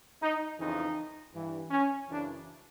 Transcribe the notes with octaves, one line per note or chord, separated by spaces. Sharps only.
D#4
F2 C#3 E3 D#4
G2 E3
C#4
F#2 C#3 E3 D4